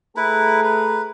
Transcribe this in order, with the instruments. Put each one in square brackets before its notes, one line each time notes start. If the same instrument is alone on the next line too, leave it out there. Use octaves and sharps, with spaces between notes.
[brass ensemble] A3 G#4 A#5 [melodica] E4 B4
[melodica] B4